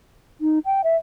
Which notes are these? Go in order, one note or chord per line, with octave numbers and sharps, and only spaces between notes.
D#4
G5
E5